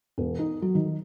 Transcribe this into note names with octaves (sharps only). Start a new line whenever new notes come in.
E1
D#4
F#3
D#3